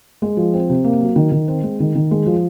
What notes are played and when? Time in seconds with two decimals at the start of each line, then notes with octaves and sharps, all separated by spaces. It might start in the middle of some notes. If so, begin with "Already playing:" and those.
0.22 G#3
0.37 F3
0.54 C4
0.69 C3
0.84 A#3
1.00 F#3
1.16 D#3
1.32 D#3
1.48 C4
1.63 G#3
1.80 D#3
1.96 D#3
2.11 G#3
2.26 F3